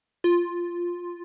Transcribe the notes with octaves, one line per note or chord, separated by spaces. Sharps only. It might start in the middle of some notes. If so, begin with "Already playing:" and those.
F4